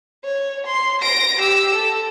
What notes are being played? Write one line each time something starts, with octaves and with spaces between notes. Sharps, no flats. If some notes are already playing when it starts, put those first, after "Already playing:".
C#5
C6
A#6 D7
G4 E6
A4